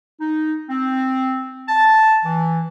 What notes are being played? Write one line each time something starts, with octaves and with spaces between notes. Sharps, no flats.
D#4
C4
A5
E3